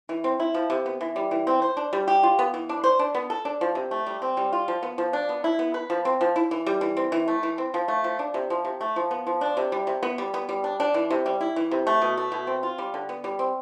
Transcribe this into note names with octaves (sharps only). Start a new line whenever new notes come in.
E3
C4
E4
F3
C3
B3
E3
G3
E3
C4
C5
D4
G3
G4
F4
B3
E3
D4
C5
D4
B3
A4
D4
F3
C3
A3
G3
C4
G3
F4
F3
B3
F3
D4
B3
E4
B3
B4
F3
C4
F3
E4
E3
G3
E3
C4
E3
A3
E3
C4
F3
A3
F3
D4
C3
F3
C3
A3
F3
B3
F3
D4
C3
G3
C3
B3
G3
B3
G3
D4
D4
E3
C3
G3
E4
E3
C3
A3
B2
A3
B2
C4
F4
G3
D3
B3
G3
C4